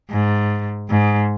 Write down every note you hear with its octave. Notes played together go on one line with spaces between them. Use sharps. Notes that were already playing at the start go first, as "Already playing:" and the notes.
G#2
G#2